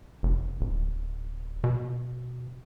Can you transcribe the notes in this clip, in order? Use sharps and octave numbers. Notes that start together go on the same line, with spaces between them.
F1
D1
B2